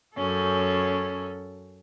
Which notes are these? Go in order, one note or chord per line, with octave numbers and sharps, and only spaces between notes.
F#2 C#4 A4